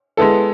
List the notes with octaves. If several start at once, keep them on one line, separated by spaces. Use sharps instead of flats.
G#3 B3 E4 A4